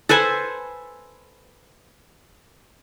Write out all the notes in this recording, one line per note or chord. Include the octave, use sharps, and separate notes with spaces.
A4 B4 C5 G#5